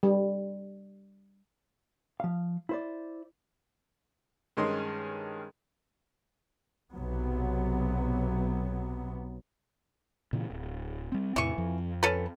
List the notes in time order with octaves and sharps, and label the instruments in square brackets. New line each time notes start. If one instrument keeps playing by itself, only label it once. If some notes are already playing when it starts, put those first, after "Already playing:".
[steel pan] G3
[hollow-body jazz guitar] F3 F5
E4 C5 D5
[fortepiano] G2 D#3 G#3 C#4 C6 D#6
[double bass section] B1 C3 F#3 B3
[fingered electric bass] A#2 C#3 E3
D1
G3 C4
[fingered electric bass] E2 A2 C3 [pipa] E3 C#6
[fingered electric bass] F2 F3
[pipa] C#4 A4 B4